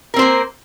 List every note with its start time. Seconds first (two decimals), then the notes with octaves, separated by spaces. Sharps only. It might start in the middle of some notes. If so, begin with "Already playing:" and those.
0.14 A#4
0.16 C4
0.19 C5
0.22 A#3